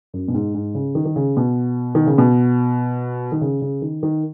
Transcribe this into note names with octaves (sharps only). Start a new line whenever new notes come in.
F#2
B2
G#2
G#2
C#3
D#3
D#3
C#3
B2
D#3
C#3
B2
D#3
C#3
C#3
D#3
D#3